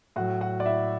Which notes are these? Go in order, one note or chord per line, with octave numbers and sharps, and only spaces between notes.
A2 F#3 F#4 F#5
F#4 F#5
D5
E4 E5